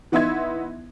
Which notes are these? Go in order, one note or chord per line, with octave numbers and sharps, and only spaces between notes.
E3 B3 D#4 E5 C6 G#6